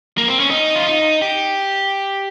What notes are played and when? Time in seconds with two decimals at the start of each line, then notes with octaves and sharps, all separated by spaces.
0.18 A#3
0.28 C4
0.40 C#4
0.51 D#4
0.75 F4
0.86 D#4
1.22 G4